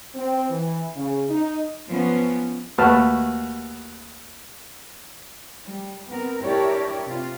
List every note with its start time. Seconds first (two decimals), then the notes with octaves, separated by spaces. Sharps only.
0.15 C4
0.49 E3
0.95 C#3
1.29 D#4
1.88 F3 B3 C#4
2.78 D#2 A3 F#4 B4 A5 F6
5.65 G3
6.09 B3 C4 A#4
6.43 D4 E4 G4 A#4 C#5 D5
7.06 C3 F4